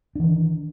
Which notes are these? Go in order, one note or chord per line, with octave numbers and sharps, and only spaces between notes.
D#3 E3 D4